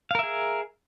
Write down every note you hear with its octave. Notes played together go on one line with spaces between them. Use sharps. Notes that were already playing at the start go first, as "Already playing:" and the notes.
G#4 A#4 E5 F5